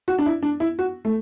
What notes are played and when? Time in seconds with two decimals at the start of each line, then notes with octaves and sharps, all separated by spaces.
0.08 F#4
0.19 D4
0.26 E4
0.43 D4
0.60 E4
0.79 F#4
1.05 A3